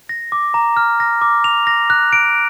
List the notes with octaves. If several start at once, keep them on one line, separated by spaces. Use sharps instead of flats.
A#6
D6
A#5
F6
A#6
D6
F7
A#6
F#6
D7